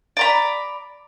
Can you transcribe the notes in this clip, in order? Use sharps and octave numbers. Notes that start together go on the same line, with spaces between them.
D5 A#5 B5